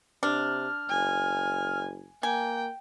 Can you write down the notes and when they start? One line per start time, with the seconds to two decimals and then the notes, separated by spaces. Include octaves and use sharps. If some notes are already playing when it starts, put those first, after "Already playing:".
0.23 C3 D4 F6
0.90 F#1 G#5
2.23 A#3 G5 G#5